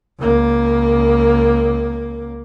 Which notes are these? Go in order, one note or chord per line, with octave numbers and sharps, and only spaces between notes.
C#2 A#3